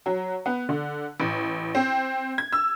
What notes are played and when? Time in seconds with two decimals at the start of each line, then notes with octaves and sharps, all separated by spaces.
0.06 F#3
0.46 B3
0.69 D3
1.20 A1
1.75 C4
2.38 G#6
2.52 E6